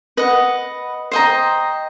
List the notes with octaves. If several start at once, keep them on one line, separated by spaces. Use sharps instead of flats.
B4 D#5 F#5
C5 D#5 G5 A#5